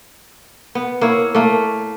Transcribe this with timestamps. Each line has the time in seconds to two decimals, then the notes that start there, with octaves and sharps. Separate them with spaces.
0.75 B3
1.01 A#3 E4 C#5
1.35 A3 A#3